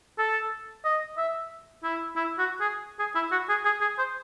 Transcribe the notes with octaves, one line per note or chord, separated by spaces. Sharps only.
A4
D#5
E5
E4
E4
F#4
G#4
G#4
E4
F#4
G#4
G#4
G#4
C5